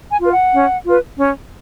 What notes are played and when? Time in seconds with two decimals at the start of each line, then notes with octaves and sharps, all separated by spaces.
0.10 G#5
0.20 F4 B4
0.31 F#5
0.53 C#4
0.86 F4 B4
1.18 C#4